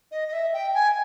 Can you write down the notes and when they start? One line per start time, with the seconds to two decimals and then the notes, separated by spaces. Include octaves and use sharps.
0.11 D#5
0.28 D#5
0.33 E5
0.53 G5
0.74 G#5